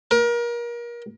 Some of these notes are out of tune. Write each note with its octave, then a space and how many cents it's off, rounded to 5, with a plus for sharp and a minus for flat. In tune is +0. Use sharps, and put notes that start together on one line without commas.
A#4 +30